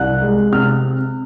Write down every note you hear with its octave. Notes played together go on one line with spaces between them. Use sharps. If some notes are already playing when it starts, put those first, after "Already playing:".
Already playing: C2 F#6
G#3
C3 F6